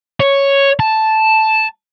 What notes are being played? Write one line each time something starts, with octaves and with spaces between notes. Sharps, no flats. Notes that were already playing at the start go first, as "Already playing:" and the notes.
C#5
A5